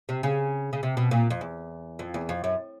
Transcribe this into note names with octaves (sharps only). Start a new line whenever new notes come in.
C3
C#3
C#3
C3
B2
A#2
F2
E2
F2
E2
F2
F#2